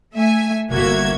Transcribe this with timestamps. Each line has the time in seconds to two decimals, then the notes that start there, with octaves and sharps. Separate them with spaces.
0.14 A3 E5 G#5
0.71 G1 C2 A#3 F#4 E5 G#6